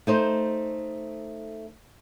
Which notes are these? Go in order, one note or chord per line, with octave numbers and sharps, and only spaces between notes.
A3 D#4 C5